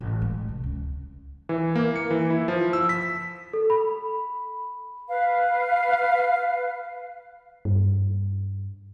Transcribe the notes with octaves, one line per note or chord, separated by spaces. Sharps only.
A1
G#3
C3
C#2
E3
A#3
C#7
E3
E4
F3
E6
B6
A4
B5
B4 F5
G2